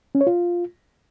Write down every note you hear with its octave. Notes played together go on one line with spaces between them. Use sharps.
C#4
C#5
F4